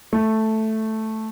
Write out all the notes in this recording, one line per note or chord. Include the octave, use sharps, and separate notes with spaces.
A3